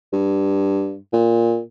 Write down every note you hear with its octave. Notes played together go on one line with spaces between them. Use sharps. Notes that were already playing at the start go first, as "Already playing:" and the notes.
G2
A#2